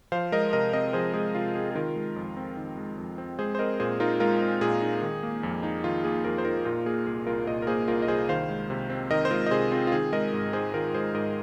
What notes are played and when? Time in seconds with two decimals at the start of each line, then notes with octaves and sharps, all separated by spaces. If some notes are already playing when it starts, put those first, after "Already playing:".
0.12 F3 C5 F5
0.32 G#3 A#4 D#5
0.53 C3 A#4 D#5
0.73 C4 A#4 D#5
0.93 F3 G#4 C5
1.14 G#3 G#4
1.35 C3 F4
1.55 C4 G#4
1.71 G#4
1.75 D#3 F4 A#4
1.96 G#3
2.16 F2
2.37 C4
2.57 D#3
2.77 G#3
2.98 F2
3.18 C4
3.39 G#3 G#4 C5
3.55 C5
3.59 C4 A#4 D#5
3.80 A#2 G#4 C5
4.00 D#4 F4 A#4
4.20 G#3 F4 A#4
4.41 C4
4.61 A#2 G#4
4.81 D#4
5.02 D#3
5.23 A#3
5.43 F2
5.63 D#4
5.84 D#3 F4
6.04 A#3 G#4
6.24 F2 F4 A#4
6.38 C5
6.45 D#4 F4 A#4
6.65 A#2 F4 A#4
6.86 A#3 G#4
7.06 C2 G#4
7.27 C2 F4 A#4
7.47 A#2 A#4 D#5
7.62 A#4
7.67 A#3 G#4 C5
7.88 C2 F4 A#4
8.02 D#5
8.08 C2 G#4 C5
8.29 D#3 C5 F5
8.49 G#3
8.70 C3
8.90 C4
9.11 D#3 A#4 D#5
9.25 C5
9.31 G#3 F4 A#4
9.46 D#5
9.51 C3 G#4 C5
9.71 C4 F4
9.87 F4
9.92 D#3 G#4
10.12 G#3 A#4 D#5
10.33 G#2
10.53 D#4 G#4 C5
10.74 D#3 F4 A#4
10.94 G#3 G#4 C5
11.14 G#2 A#4 D#5